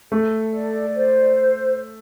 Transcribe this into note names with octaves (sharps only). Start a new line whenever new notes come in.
A3 A4
D5
C5